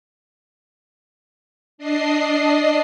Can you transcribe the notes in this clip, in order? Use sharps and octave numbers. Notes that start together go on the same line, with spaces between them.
D4 D#5 C7